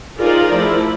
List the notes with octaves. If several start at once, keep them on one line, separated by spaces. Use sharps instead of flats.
D#4 F4 G#4 A#4 C5 D5
F3 A3 E4